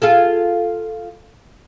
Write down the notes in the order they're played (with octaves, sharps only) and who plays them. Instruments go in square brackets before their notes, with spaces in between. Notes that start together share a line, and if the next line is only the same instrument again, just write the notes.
[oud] F4 G#4 A4